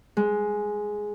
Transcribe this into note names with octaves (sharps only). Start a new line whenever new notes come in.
G#3